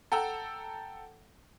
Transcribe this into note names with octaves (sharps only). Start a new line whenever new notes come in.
A4 F#5 G5 A#5 E6